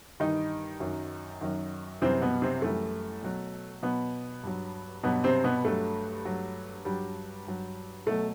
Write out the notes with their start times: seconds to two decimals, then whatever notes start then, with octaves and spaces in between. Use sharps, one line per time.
0.20 G2 D#3 E3 G3 D#4
0.80 F#2 D#3 F#3
1.41 F#2 D#3 F#3
2.02 F#2 C3 E3 G3 C4
2.22 B2 B3
2.42 C3 C4
2.62 F#2 E3 G3 A3
3.23 B2 F#3
3.83 B2 F#3 B3
4.43 G2 F#3
5.03 G2 B2 F#3 B3
5.24 C3 C4
5.44 B2 B3
5.65 G2 F#3 A3
6.25 G2 F#3
6.85 G2 F#3 G3
7.47 G2 F#3
8.06 B2 F#3 A3